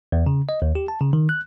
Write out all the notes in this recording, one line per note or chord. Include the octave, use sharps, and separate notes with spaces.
E2
C#3
D#5
D#2
G4
A5
C#3
D#3
F#6